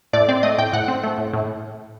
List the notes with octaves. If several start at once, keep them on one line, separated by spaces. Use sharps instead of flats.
A2 D5
C4 D5
A3 D#5
A2 G5
A2 F#5
C4
A3
A2
A2